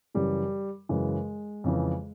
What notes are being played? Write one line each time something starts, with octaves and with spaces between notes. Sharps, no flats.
F#2 C#3 E3 G3
F#2 C#3 E3 G#3
F2 C#3 E3